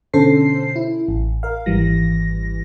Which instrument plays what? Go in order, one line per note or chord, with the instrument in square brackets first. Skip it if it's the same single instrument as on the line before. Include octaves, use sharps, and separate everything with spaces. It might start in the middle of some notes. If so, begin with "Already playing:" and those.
[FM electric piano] B2 D3 C#4 A4 C5 C7
E4
A1
A#4 F5
G#1 E3 G3 A#6